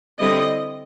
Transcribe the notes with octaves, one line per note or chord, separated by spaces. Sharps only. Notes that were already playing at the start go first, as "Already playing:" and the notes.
D3 G3 C4 E4 D#5